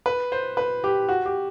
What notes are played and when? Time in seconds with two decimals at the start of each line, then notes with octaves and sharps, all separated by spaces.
0.06 B4
0.32 C5
0.57 B4
0.84 G4
1.09 F#4
1.26 G4